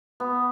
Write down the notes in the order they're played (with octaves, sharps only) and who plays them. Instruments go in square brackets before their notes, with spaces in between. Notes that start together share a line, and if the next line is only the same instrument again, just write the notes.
[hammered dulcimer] B3